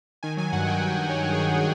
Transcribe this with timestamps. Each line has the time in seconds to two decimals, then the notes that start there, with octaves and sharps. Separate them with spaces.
0.23 D#3 G#5
0.37 F#3 G#5
0.53 G2 F#5
0.66 G2 G5
0.81 D#3
0.96 F#3
1.09 G2 C#5
1.25 G2
1.32 G#4
1.39 D#3
1.53 F#3